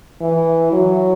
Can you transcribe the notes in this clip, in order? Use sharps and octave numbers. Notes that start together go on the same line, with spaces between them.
E3
F#3